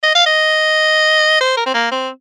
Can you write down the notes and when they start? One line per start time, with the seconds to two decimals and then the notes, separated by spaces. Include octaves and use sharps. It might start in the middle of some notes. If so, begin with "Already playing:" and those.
0.03 D#5
0.15 F5
0.27 D#5
1.41 C5
1.57 A#4
1.66 C4
1.74 A#3
1.92 C4